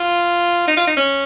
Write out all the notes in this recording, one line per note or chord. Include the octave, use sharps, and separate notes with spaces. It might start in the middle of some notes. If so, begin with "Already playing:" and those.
Already playing: F4
D#4
F4
D#4
C#4